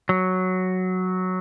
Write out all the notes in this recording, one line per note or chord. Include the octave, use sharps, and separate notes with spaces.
F#3